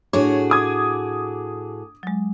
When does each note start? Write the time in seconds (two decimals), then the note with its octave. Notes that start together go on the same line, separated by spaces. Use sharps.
0.13 A2 D4 F#4 G#4 C#5
0.50 D6 D#6 G#6
2.03 F#3 G#3